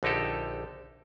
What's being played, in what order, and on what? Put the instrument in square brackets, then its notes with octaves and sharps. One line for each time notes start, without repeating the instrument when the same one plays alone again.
[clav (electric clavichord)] A#1 D3 D#4 G4 A4